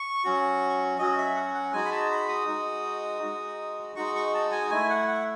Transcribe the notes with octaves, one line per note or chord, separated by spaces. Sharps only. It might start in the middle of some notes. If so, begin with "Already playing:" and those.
Already playing: C#6
F#3 C#4 F#4
F#3 C#4 F#4 D#5
E5
F#5
F#5
G#3 D#4 F#4 G#5
B5
A5
B5
D#6
G#3 D#4 F#4
G#3 D#4 F#4
G#3 D#4 F#4 C#6
C#6
A5
G#5
A3 E4 G#5
F#5
F#5